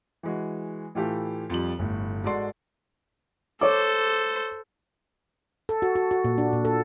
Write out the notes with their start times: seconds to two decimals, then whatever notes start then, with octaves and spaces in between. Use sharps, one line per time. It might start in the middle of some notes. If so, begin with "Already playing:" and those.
0.23 E3 G#3 F#4
0.95 A2 E3 F4 G4 A4
1.50 F2 F3 G3 F#7
1.79 G1 A2
2.24 G#2 G#3 F#4 A4 D5 C6
3.61 A4 C5 C#5 D6
5.69 A4
5.82 F#4
5.95 F#4
6.11 F#4
6.25 A#2
6.38 D4
6.53 A#2
6.65 A4